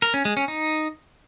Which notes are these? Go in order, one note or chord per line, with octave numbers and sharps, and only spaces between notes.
A#4
C#4
G#3
C#4
D#4